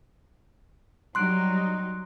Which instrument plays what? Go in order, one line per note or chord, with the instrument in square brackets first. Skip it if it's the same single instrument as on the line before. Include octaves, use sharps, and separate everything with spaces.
[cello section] F#3 G3 D#4 [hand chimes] C6 F#6 D7